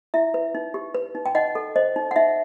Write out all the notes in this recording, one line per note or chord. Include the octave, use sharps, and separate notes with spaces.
E4 E5
B4
D#4
G4
B4
D#4
G5
D#4 D#5 F#5
A4
C5 D#5
D#4
F#5
D#4 E5